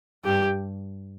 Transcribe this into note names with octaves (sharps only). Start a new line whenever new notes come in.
G2 G4